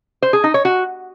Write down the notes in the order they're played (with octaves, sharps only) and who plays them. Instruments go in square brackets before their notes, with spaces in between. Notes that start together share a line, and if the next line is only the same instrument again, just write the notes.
[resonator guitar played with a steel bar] C5
G#4
D#4
C#5
F#4